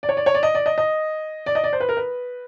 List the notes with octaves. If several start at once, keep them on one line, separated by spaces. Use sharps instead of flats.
D5
C#5
D5
C#5
D5
D#5
D5
D#5
D#5
D5
D#5
D5
C5
B4
A#4
B4